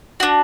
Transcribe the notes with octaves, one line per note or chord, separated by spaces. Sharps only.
D4 F#4